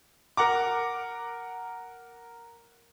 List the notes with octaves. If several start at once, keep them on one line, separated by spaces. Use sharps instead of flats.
A#4 F#5 A#5 D6